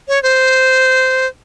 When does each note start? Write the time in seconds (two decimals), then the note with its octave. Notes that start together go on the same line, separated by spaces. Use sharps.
0.08 C#5
0.23 C5